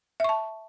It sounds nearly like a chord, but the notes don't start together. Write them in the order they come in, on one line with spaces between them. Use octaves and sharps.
E5 C#6 A5